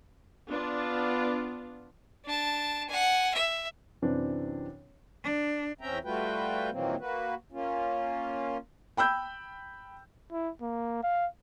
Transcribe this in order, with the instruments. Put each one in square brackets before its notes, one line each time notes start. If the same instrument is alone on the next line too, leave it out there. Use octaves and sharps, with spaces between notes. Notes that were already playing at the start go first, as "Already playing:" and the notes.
[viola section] B3 D4 F4
[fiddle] D4 A5
F#5 G#5
E5
[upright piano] F#2 C3 E3 C4 D4
[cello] D4
[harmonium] E2 C4 C#4 E5 G5 A#5
G3 A3 F4 F#4 B4 G5
A#2 D#3 E3 F#3 A#3 C4
A#3 F#4 B4
A#3 C#4 F4
[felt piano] G5 B5 E6 G6
[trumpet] E4
A#3
F5